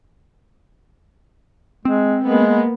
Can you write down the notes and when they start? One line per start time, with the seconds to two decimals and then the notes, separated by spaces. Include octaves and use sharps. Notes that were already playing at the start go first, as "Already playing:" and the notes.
1.85 G#3 C4
2.23 G#3 A#3 B3